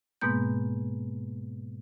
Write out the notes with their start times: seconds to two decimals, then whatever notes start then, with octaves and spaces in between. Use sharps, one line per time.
0.21 G#2 B2 G#3 A#3 B3 G6